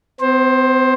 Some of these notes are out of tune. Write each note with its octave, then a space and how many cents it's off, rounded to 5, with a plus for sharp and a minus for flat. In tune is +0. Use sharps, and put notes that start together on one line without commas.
C4 -40 C5 +15